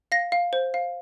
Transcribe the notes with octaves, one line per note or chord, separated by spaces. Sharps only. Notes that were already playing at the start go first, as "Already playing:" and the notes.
F5 A#6
F5
C5
F5